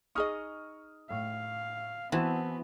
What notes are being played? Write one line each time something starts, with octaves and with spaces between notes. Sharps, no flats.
D#4 G#4 D#5 C#6 D#6 F6
A2 F5
E3 B3 C4 E4 F#4 A5